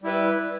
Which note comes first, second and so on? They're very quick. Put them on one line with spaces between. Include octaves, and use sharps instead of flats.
G3 E4 B4